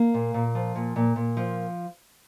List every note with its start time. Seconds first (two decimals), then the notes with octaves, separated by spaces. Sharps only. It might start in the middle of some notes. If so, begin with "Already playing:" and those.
Already playing: A#3
0.14 A#2
0.34 A#2
0.55 F3
0.76 A#2
0.96 A#2
1.16 A#2
1.37 F3